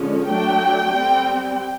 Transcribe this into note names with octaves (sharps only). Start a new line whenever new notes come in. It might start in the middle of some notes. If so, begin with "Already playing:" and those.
Already playing: D3 F3 G#3 C#4
F#3 A3 D4 G5
G3 C4